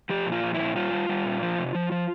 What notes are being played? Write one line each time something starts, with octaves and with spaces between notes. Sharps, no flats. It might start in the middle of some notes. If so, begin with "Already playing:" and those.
F3 G4
A#2
F4
F3
A#2 E4
G3 F4
G3
G3
A#2
F3
C3
F3
F3